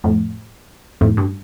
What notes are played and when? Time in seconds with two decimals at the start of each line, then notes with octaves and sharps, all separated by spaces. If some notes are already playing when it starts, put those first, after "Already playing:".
0.04 F2 A2
1.01 F2 A2
1.17 G2